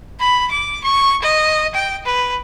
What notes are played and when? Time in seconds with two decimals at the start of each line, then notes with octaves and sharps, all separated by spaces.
0.20 B5
0.51 D6
0.84 C#6
1.22 D#5
1.75 G5
2.06 B4